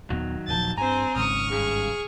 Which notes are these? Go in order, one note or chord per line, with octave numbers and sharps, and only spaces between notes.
D#1 D#3 F#3 B3
D#1 A#2 F3 A5 G6 A6
G2 C4 C5 G#5 A#5
G#1 G#2 C#3 C#6 D#6 F6
C#2 G2 G#4